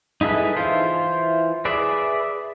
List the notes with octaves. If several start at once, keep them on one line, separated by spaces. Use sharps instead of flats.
D#4 E4 G#4 A4 B4
E3 E4 F4 C5
G#4 B4 D5 E5